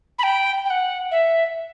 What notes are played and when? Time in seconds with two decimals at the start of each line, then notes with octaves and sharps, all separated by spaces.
0.19 B5
0.23 G5
0.65 G5
0.70 F#5
1.11 E5